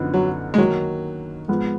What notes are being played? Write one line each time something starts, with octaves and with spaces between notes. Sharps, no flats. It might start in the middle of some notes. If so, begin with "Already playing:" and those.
Already playing: F#2 D3 F3 B3 D#4
F#3
G#3
D#3 F#3 A#3 D#4
G#2 F3 B3